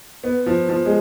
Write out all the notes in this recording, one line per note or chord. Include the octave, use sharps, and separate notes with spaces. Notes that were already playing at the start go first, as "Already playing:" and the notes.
B3
F3
F3
G#3